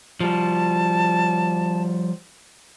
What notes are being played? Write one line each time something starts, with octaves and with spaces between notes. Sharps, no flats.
F3 G3 A5